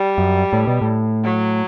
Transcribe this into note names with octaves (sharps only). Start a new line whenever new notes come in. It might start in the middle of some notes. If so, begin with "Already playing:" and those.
Already playing: G3
F#2
A2
B2
A2
F#3